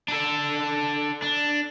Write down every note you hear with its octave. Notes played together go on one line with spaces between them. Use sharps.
D4 A4
D4